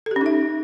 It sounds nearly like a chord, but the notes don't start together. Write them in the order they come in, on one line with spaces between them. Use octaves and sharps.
A4 G4 C#4 D#4 E5